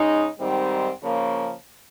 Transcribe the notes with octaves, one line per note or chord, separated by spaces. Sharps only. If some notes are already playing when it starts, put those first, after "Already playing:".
Already playing: C#3 G#3 D#4
G#2 D#3 G3 C4
C#3 F3 A#3